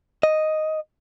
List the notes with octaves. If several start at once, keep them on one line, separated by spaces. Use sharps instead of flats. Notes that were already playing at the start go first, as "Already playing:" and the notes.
D#5